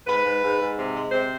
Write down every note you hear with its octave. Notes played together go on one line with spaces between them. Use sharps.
G#2 B4
G#2
G#2
G#2
C3
G#3
C3 C5